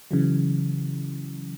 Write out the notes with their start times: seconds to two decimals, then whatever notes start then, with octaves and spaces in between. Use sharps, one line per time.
0.11 C#3 E3 F#3